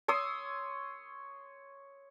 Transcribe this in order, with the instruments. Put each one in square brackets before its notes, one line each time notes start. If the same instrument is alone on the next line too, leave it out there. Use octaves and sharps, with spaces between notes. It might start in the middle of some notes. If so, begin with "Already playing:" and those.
[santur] C#5 C6 D#6 E6